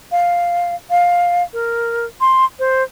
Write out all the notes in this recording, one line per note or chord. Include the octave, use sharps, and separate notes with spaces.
F5
F5
A#4
C6
C5